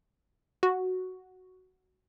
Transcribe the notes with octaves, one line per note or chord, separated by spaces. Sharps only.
F#4